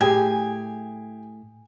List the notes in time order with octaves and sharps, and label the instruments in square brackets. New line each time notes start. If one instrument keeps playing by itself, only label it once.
[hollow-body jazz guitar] A2 [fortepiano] G4 G#4 [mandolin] G#5